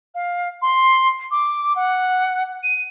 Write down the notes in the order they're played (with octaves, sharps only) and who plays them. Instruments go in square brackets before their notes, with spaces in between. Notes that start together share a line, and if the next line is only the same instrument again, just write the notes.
[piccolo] F5
C6
D6
F#5
D#7